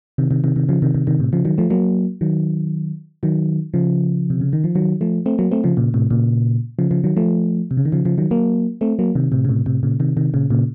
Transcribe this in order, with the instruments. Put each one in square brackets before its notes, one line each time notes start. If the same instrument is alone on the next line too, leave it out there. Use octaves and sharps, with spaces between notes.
[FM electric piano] C3 D#3
C3 D#3
C3 D#3
C3 D#3
C#3 F3
C3 D#3
C3 D#3
C3 D#3
A2 C3
C#3 F3
D#3 F#3
F3 A3
F#3 A#3
D#3 F#3
D#3 F#3
C#3 F3
C3
C#3
D#3
F3
D#3 F#3
F3 A3
A3 C4
F#3 A#3
A3 C4
C#3 F3
A#2 C#3
A2 C3
A#2 C#3
C#3 F3
C#3 F3
D#3 F#3
F3 A3
C3
C#3
D#3
C#3 F3
C#3 F3
D#3 F#3
F#3 A#3
A3 C4
F#3 A#3
C3 D#3
A2 C3
C#3
A2 C3
A2 C3
A#2 C#3
C3 D#3
C3 D#3
A#2 C#3
A#2 C#3